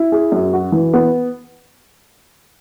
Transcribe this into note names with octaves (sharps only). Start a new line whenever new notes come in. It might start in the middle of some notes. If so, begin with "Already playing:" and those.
Already playing: E4
G#4
F#2
F#4
E3
B3